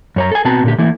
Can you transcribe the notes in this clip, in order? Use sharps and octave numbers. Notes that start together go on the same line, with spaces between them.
F#2 C#5 A#5
A4 G#5
B2 B3 C4 F#4 A5 A#5
A#2 D3 G4
E3 A3 A#3 E4